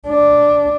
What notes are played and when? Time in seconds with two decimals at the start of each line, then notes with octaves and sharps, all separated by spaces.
0.09 D4